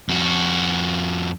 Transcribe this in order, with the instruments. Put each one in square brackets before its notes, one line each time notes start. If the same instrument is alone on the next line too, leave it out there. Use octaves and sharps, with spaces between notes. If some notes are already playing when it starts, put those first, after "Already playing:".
[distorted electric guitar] F2 F#4